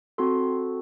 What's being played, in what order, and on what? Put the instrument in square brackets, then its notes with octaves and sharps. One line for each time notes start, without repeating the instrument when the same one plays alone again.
[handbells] C4 F#4 A4 C6